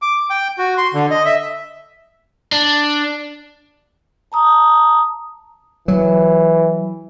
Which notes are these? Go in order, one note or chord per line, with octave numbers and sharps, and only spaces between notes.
D6
G5
F#4
C6
D3
D#5
E5
D4
A5 A#5 D#6
E3 F#3